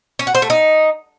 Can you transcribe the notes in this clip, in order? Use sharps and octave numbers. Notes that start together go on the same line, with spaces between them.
C#4
F#4
C5
A3
D#4